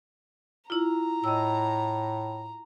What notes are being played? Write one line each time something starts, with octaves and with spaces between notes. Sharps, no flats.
E4 F4 A#5
A2 D#5 E6